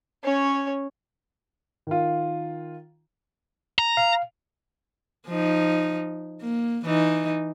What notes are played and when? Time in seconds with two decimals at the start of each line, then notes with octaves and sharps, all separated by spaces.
0.24 C#4 C#5
1.87 D#3 F4
3.78 A#5
3.97 F5
5.27 F3 D#4
6.41 A#3
6.85 E3 D#4